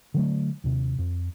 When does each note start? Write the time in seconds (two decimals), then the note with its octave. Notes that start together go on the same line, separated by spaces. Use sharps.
0.14 D3 F#3 A3
0.64 D#2 C3
0.99 F2